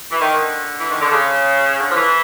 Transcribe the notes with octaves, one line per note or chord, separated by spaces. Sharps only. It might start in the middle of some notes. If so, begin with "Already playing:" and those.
E3
D#3
D3
E3
D#3
D3
C#3
D3
F3
E3